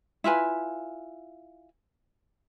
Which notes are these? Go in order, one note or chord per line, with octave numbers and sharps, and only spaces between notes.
E4 F4 B4 G#5